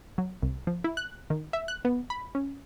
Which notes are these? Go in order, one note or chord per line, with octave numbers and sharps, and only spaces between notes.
F#3
C2
F3
E4
F#6
D#3
E5
F#6
B3
B5
C#4